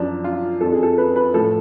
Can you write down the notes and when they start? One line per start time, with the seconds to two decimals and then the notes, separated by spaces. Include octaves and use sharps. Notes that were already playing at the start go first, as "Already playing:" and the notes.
Already playing: F#2 F3 D4
0.24 F4
0.61 F2 F3 A4
0.72 G#4
0.83 A4
0.98 B4
1.16 B4
1.34 A2 F3 A4